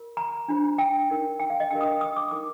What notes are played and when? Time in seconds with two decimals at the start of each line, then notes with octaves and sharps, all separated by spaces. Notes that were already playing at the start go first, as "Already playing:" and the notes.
Already playing: F4 A#4
0.17 A#5
0.48 D4 F4 C5
0.78 G5
1.10 D#4 A#4
1.40 G5
1.50 F5
1.60 D#5
1.71 D4 G4 A#4 G5
1.81 D#6
2.01 D#6
2.16 D6
2.31 D#4 A#4 D6